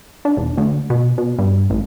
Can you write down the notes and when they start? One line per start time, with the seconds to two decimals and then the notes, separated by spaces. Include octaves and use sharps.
0.25 D4
0.37 E1
0.57 D2
0.90 B2
1.18 B2
1.38 G2
1.70 A1